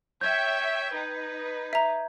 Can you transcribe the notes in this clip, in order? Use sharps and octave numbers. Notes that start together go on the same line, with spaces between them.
C#5 E5 G5 G6 G#6
D#4 B4
E5 A#5